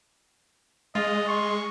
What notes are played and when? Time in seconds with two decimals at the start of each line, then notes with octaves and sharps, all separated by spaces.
0.95 G#3 F4 D#5
1.28 C6 C#6